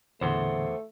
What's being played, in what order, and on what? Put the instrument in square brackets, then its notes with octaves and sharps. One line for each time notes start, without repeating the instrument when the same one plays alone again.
[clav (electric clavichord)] E2 [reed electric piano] A#2 D3 [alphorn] A3 [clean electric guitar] C5 F#5 C6